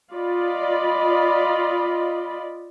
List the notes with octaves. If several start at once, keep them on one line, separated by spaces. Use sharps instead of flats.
F4 D5 D#5 B5